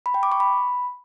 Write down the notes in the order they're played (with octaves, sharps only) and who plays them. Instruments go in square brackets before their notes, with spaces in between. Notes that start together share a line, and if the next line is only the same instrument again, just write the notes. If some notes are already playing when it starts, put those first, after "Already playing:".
[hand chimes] B5
G5
D6
C#6
B5